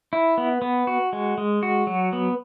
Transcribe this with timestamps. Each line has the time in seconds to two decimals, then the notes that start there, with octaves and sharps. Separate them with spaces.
0.13 E4
0.38 B3
0.62 B3
0.87 F#4
1.13 G#3
1.38 G#3
1.63 F#4
1.87 F#3
2.13 B3